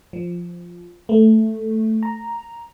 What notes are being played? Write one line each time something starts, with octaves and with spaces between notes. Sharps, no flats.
F3
A3
A#5